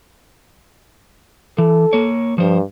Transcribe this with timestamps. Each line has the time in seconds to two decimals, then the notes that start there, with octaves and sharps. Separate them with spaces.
1.58 E3 A4
1.93 A#3 C#5
2.38 G2 F3 C5